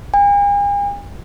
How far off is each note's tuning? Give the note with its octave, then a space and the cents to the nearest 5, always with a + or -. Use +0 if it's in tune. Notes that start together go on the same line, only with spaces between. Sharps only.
G#5 -45